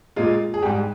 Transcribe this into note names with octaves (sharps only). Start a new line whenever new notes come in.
A#2 G#3 F4
G#4
G#2 G3 G4